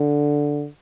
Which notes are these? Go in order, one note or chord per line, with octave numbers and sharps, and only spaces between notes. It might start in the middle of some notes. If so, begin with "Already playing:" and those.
Already playing: D3